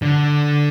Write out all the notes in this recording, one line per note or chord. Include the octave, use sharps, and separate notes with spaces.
D3